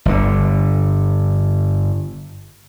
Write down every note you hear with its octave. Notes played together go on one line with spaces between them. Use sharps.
G1 D3